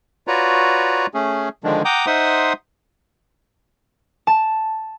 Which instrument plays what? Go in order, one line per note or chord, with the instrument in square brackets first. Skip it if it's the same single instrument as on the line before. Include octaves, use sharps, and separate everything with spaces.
[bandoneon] F4 F#4 B4 C#5 D5 A#5
A3 C#4 G#4
D3 D#3 F3 G#3 D4
F#5 G5 A#5 D6 D#6 G6
D#4 C5 E5 F#5 C6 D#6
[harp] A5